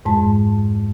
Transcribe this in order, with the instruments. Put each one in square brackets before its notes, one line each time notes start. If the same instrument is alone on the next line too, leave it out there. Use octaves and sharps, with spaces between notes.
[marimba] F2 G#2 G#3 A5